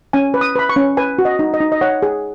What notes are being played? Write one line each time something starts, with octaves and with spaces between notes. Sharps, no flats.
C#4 G#5
B4
D#6
B4 B5
C#6
C#4
B4 G#5
F#4
D#5
D#4
D#5
D#4
D#5
C#5 F#5
G#4